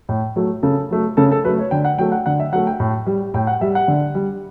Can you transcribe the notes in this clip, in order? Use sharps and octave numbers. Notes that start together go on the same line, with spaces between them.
A2
F#3 A3
C#3 A4
F#3 A3
C#3 A4
A4
F#3 A3 B4
C#5
D3 G5
F#5
F#3 A3 G5
F#5
D3 F#5
E5
F#3 A3 F#5
G5
A2
G3
A2 G5
F#5
G3 E5
F#5
D3
G3